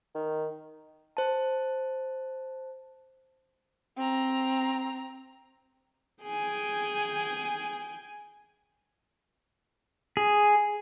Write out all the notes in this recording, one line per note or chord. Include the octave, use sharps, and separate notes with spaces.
D#3
C5 A5
C4 A#5
G#4 G5 G#5
G#4